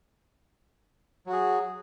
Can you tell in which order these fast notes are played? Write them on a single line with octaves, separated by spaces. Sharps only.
F#3 F#4 G#4